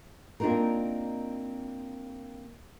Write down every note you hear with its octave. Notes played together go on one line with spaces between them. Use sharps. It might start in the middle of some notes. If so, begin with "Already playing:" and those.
A#3 C4 D4 D#4 F4 A#4